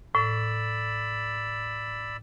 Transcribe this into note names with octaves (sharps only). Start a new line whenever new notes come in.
A2 D5 B5 E6